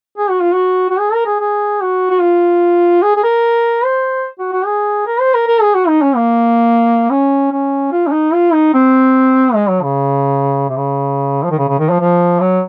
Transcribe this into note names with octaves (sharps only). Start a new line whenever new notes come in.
G#4
F#4
F4
F#4
F#4
G#4
A#4
G#4
G#4
F#4
F#4
F4
G#4
G#4
A#4
C5
F#4
F#4
G#4
A#4
C5
A#4
A#4
G#4
F#4
D#4
C#4
A#3
C#4
C#4
F4
C#4
D#4
F4
D#4
C4
G#3
F#3
C#3
C3
C#3
F3
D#3
C#3
C#3
D#3
F3
F3
F#3